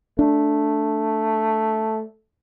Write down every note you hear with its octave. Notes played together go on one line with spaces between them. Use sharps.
A3 D4